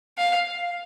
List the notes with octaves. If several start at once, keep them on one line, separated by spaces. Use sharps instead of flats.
F5